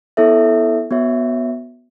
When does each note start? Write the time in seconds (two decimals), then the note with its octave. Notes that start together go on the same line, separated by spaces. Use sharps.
0.17 B3 E4 A4 C#5 E5
0.91 B3 F#4 C#5 E5